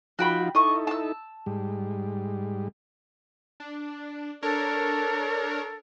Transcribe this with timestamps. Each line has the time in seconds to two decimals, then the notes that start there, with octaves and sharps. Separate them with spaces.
0.19 F3 D#4 F4 F#4 G5 B5
0.55 D#4 E4 A4 D#5 C#6
0.87 A5 E6
1.46 G#2 G3
3.60 D4
4.42 D4 A4 A#4 C#5